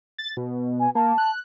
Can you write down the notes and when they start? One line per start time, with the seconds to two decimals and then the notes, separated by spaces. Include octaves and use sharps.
0.18 A6
0.37 B2
0.80 G#5
0.95 A#3 A5
1.18 F#6